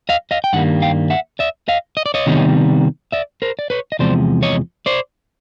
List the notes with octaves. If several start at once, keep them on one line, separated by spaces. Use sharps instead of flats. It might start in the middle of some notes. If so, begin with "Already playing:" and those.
D#5 F5
D#5 F5
G5
G2 D#3 G3 A#3 F#5
F5 G5
E5 F#5
D5 E5
D#5 F5
D#5
D5
C#5 D#5
C3 D#3 G3 B3
D5 E5
A#4 C5
D5
B4 C#5
D#5
E2 C3 F3 G#3 C5 D5
C#5 D#5
C5 D5